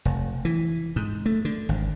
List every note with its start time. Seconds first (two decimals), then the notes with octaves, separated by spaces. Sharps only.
0.05 F1
0.45 E3
0.96 G#2
1.26 A3
1.45 D3
1.69 G#1